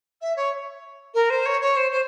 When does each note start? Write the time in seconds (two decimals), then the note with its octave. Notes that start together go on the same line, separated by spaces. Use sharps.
0.21 E5
0.36 C#5
1.14 A#4
1.29 C5
1.45 C#5
1.61 C#5
1.76 C5
1.91 C5